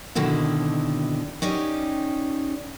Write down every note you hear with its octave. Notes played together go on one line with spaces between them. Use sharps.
B2 D3 D#3 C4 E4
C#4 D#4 G4 D5